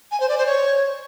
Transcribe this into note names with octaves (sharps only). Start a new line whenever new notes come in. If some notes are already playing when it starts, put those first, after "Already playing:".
G#5
C5
D5
C5
C#5